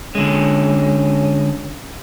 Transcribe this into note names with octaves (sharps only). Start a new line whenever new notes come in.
D3 G#3 C#4